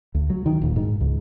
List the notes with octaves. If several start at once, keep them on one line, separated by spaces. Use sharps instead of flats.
D2
F#3
D#3
D#1
G#2
C#2